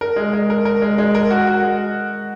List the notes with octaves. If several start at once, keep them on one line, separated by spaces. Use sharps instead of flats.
A#4
G#3
G#3
A#4
A#4
G#3
G#3
A#4
F#4
F#4
G#3